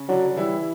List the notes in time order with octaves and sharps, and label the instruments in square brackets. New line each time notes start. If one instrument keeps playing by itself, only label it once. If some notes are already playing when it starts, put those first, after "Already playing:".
Already playing: [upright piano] C#3 C#4
[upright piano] D3 D4 [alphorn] F#3
[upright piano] E3 E4 [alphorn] G3